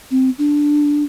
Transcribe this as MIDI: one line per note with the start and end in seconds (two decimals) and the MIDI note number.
0.11 0.30 60
0.38 1.04 62